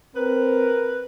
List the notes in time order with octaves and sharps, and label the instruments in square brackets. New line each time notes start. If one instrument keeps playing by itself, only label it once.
[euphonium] C4 [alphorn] A#4 [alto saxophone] B4